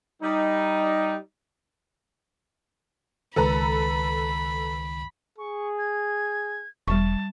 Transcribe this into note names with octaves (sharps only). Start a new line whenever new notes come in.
G3 D#4
C#2 D#3 A4 B4 A#5 B5
G#4 C#6
G#6
E1 G3 A5 C#6